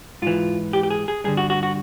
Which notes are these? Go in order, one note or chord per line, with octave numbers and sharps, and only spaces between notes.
G#2 E3 F4
G4
G4
G#4
G#4
G2 D3 G#4
F#4
F#4
F#4